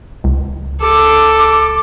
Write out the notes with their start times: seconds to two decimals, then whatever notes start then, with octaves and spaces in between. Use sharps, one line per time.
0.24 C#2
0.81 A4 D6